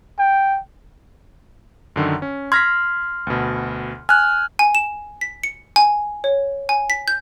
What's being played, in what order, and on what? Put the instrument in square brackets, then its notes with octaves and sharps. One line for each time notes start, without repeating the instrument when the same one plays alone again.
[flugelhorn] G5
[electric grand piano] F#2 D3 D#3
C#4
[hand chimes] C6 F6 [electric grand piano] G#6 A#6 B6
[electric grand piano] D2 B2
[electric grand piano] G#5 [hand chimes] F6 F#6
[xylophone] G#5
E7
B6
C#7
G#5
C#5
G#5
B6
G6